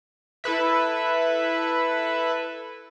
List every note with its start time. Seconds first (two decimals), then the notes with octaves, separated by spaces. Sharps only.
0.44 E4 A4 B4 E5